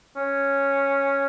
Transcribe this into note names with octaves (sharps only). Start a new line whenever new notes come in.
C#4